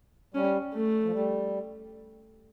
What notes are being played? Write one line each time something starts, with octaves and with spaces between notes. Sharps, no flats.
G3 C#4
A3
F3
G3